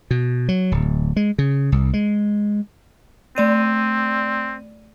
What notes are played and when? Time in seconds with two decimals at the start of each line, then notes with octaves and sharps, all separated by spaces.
0.11 B2
0.49 F#3
0.72 D1
1.16 G#3
1.38 C#3
1.72 C2
1.93 G#3
3.36 A3 C4 D5 D#7